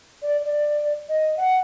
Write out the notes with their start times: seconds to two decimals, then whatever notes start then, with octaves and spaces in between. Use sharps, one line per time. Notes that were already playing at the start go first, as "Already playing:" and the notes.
0.22 D5
0.45 D5
1.09 D#5
1.37 F#5